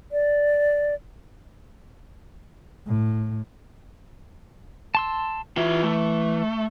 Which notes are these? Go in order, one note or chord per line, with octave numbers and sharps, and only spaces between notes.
D5
A2
A5 C6 E6
E3 F4 E5
A3